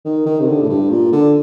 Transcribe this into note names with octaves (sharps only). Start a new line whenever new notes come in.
D#3
D#3
C3
D3
A2
G2
A#2
D3